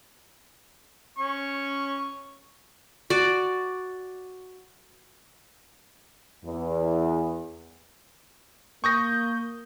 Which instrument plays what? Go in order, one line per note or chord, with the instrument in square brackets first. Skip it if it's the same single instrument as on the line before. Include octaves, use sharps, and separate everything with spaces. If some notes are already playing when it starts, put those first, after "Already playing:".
[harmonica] C#4 C#6
[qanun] F#4 D5
[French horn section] E2
[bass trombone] A#3 [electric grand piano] C#6 D#6 A#6 [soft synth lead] G6